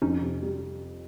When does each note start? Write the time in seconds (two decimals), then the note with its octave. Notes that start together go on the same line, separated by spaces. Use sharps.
0.02 F2 C#4 D#4
0.21 C3
0.42 G3